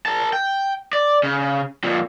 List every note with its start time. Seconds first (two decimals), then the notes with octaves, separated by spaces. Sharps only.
0.06 A#4 A5
0.33 G5
0.93 D5
1.23 C#3
1.84 F2 A#2